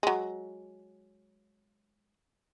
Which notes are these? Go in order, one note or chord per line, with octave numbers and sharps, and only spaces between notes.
F#3 G#3